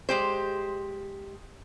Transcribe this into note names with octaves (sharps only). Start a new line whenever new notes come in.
G#3 G4 C5